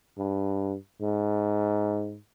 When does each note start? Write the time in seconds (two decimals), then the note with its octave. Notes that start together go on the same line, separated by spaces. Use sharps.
0.18 G2
1.01 G#2